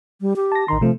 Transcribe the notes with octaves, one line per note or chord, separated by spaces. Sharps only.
G3
G4
A5 A#6
A1 D#3 A#5 C6
C3 F3 A3